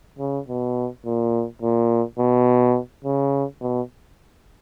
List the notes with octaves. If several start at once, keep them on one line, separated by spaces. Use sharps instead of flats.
C#3
B2
A#2
A#2
B2
C#3
B2